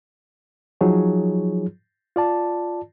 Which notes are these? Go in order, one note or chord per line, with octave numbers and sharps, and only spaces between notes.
F3 F#3 D#4 F4 G#4 C#5
F4 D5 A5